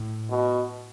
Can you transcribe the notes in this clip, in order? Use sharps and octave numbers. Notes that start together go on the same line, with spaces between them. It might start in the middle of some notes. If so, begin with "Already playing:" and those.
Already playing: A2
B2